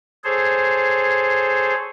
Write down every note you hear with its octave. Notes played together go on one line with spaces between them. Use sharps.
G#4 A4 C5 C#5